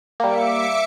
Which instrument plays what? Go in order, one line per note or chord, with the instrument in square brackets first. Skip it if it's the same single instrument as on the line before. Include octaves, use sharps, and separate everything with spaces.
[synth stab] G3 A#3 [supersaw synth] E5 D6 C#7